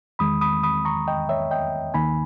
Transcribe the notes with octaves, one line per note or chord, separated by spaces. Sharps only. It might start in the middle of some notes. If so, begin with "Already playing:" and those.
E2 D#3 G#3 B5 D#6
B5 D#6
B5 D#6
A#5 C#6
D#5 G5
C#5 E5
D#5 G5
D#2 D#3 A#3 D#4 G#5 B5